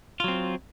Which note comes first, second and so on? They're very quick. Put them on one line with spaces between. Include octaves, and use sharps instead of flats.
F4 F#3 C4